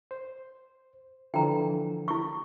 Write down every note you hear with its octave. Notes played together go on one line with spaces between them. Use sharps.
C5
D3 E3 F3 G5 A#5
E4 C#6